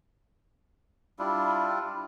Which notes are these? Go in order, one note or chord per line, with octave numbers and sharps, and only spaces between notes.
G3 D4 E4 F4